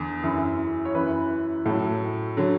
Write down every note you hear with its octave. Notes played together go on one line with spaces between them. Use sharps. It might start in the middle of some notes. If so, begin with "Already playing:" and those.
Already playing: E2 D3
F#2 E3
C#5
F#2 E3 B4
A2 F#3 A4
D3 F#3